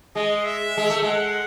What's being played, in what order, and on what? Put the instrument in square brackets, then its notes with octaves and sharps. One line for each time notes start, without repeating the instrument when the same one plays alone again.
[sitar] G#3 [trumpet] D#5
[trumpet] E5
[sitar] G#3
A3
[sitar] G#3 [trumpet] F#5